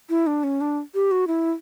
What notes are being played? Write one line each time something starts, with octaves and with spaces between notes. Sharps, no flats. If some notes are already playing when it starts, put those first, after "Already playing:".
E4
D4
C#4
D4
G4
F#4
E4